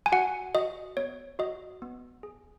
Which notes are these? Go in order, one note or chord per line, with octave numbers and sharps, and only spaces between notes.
G#5
F#4 F#5
F#4 D#5
B3 C#5
F#4 D#5
B3
G#4